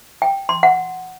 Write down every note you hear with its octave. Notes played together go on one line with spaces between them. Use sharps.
G5
C6
F#5